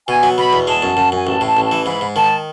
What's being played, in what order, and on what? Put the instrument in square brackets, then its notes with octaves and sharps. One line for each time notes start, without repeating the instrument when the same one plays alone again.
[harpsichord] B2 [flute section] G#5
[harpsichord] F#3
[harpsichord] B2 [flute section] B5
[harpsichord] E2
[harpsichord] G#3 [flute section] A5
[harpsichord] F#2
F#2
[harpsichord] F#2 [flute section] G#5
[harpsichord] A1 [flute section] A5
[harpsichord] A2
[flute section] A5
[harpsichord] A1
[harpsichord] E3 [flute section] A5
[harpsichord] G#2 [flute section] B5
[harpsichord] G#2
[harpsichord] D#3 [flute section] A5